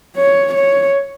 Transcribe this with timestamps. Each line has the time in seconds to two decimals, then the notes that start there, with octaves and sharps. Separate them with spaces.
0.17 C#5
0.54 C#5